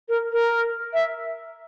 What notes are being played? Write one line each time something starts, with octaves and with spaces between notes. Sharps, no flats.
A#4
A#4
E5